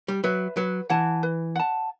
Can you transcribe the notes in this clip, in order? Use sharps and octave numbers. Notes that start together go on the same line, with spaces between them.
G3
F#3 B4 E5
F#3 B4
E3 F#5 A5
B4
F#5 A5